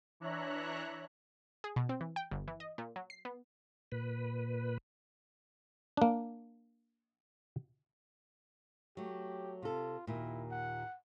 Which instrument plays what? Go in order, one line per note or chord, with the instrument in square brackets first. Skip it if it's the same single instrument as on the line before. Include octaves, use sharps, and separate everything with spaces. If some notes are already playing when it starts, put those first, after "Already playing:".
[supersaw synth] E3 D4 C#5 E5 A#5 F#6
[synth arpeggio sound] G#4
B2
C4
E3
G5
G1
E3
D#5
A#2
F#3
C7
B3
[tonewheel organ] A#2 B4
[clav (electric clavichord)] A#3 D4
[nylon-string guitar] F#3 A3 [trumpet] G4
[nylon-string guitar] C3 A4 [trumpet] F4
[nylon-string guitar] D#2 A#2 [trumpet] E4
[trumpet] F#5